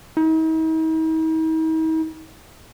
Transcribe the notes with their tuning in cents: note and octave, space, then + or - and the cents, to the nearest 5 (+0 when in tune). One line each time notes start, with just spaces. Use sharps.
D#4 +45